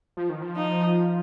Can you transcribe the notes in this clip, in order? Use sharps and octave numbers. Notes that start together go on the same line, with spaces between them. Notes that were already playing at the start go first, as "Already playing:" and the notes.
F3
D#3
F3
D#4